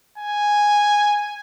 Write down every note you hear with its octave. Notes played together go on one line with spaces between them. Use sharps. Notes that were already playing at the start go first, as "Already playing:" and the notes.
G#5